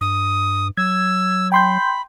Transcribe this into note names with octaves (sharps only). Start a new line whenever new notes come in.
G2 D#6
F#3 E6 G#6
G5 B5 C6 G6